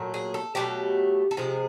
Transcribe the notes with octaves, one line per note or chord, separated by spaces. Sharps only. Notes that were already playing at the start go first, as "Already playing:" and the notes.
Already playing: A#2 F#3 A3
G#4
A4
B2 F#3 A3 G4
A4
C3 F3 G#3 G#4